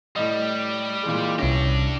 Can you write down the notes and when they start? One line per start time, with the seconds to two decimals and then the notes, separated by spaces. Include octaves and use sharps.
0.16 A2 G3 D#5
1.03 A#2 E3 G#3
1.39 C2 C#4 D4 E4 G4 A#6